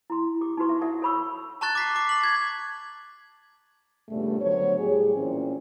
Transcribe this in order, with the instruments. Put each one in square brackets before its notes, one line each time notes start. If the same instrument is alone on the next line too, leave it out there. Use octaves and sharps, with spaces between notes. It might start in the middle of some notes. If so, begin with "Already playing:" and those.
[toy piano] E4 C6
G4 D6
D#4 E4 F#4 B4 C6 C#6
E5
A4 D5 E5 F#5
A4 C#5 B5 C#6 E6
[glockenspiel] A5 A#5 C#6 F#6 A6
D6 B6 C7
D6
B6 F#7
G#6
[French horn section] G2 A#2 C#3 G3 A3 B3
D3 F#3 B3 C5 C#5
A2 G3 G4 G#4
A#2 E3 C4 C#4